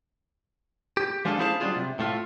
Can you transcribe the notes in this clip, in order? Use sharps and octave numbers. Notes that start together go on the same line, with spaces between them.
G4
F3 G#3 D4 F4 G#4 A4
C#4 E4 G#4 C5 F5 A5
F#3 G3 A3 D4 F4 G#4
C3
A2 A3 F4